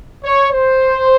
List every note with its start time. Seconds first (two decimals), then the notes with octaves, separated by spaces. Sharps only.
0.23 C#5
0.53 C5